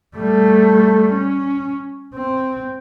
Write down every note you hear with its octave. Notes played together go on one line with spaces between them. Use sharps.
G3 A3
C#4
C4